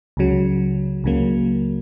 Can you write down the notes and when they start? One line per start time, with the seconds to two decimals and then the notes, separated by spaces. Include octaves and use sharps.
0.17 C#2 C#3 F#3
1.04 C#2 C#3 F#3 A#3